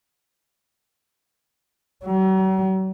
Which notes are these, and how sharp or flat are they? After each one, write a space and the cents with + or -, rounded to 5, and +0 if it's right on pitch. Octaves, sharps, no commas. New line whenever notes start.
F#3 +45